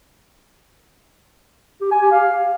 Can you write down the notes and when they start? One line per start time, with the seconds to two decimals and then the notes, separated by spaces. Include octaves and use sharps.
1.81 G4
1.91 G#5
2.01 G4
2.11 F5